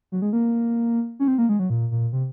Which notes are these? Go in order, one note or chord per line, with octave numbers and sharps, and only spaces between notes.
F#3
G#3
A#3
C#4
C4
A#3
G#3
F#3
A#2
A#2
C3